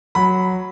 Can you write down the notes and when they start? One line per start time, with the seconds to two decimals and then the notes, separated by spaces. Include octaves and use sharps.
0.15 F#3 B5